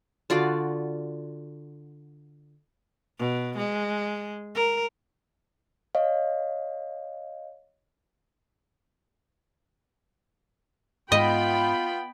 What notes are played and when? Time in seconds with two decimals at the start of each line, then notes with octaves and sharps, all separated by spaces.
0.30 D3 F4 F#4 D5
3.19 B2
3.57 G#3
4.55 A#4
5.95 C#5 D#5 F5
11.12 G#2 B3 F4 D#5 G5 B5